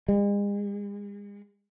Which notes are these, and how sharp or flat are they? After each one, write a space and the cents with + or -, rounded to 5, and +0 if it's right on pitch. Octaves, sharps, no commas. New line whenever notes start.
G#3 -40